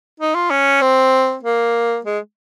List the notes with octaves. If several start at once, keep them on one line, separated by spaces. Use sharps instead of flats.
D#4
F4
C#4
C4
A#3
G#3